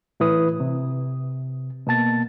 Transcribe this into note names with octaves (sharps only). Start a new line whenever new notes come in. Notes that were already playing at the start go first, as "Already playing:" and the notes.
A2 E3 E4 B4 D#6
C3
B2 A#3 A5 A6